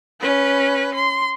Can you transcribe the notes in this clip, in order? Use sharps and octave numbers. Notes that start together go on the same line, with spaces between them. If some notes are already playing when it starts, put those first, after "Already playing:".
C#4 B4
C6